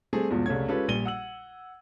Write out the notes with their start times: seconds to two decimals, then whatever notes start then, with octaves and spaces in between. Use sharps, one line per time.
0.13 G3 A3 C4 G#4
0.30 E2 G#2 B2 F3
0.46 C2 C#3 A3 C#5 G#6
0.68 G#3 C#4 F4 G4 A4 B4
0.88 A#1 G3 D#7 G7
1.05 F#5 E6 F#7